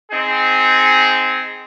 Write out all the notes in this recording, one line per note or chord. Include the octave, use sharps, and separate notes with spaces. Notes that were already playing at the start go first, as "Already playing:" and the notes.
C4 D#4 G#4